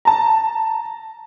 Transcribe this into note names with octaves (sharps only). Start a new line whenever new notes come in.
A5 A#5